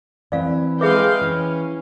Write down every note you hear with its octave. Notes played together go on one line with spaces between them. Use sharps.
E3 C4 D5 F5
G#3 G#4 B4 E5 F5 G5 D6
E3 C#4